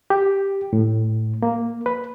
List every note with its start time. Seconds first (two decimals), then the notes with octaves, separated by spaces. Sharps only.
0.10 G4
0.73 A2
1.43 A#3
1.86 B4